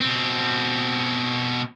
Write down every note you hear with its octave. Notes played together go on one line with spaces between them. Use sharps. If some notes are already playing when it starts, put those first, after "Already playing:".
B2 C4